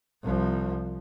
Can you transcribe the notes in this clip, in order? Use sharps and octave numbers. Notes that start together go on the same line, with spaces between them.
C2 F3